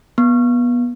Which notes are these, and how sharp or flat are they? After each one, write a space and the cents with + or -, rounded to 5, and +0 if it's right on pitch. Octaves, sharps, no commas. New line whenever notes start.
B3 -25